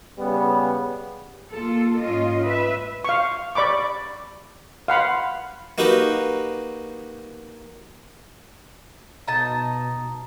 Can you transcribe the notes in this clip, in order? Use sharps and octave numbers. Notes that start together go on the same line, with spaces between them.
C#3 G3 B3
A#3 F4 A4
G#2 C#4 F4 D#5
B4 E5
F5 C#6
D5 B5 C#6 D6
F5 F#5 B5 C6
A#3 D#4 F#4 G4 B4
B2 D#4 A5